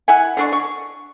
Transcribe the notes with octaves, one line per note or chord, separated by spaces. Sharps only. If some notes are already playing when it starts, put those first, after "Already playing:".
E4 F#5 G#5
D3 D4 C#6
C#6